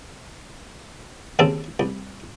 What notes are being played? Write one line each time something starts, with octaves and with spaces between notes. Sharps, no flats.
D#2 C#3 C4 A4
C2